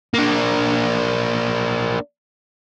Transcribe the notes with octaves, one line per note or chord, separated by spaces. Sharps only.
A#3 D4